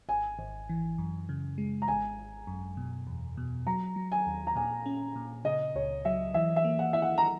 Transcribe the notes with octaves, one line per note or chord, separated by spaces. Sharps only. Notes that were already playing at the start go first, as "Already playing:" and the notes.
G#1 G#5
G#1
E3
F#2
C#3
G#3
A#5
G#1 G#5
G#1
F#2
B2
E2
B2
F#3 A#5
F#3
G#5
D#2
A#5
A#2 G#5
C#4
A#2
C#3 D#5
C#2 C#5
F#3 E5
E3 E5
E5
A#3
F#5
E4 E5
F#5
A#5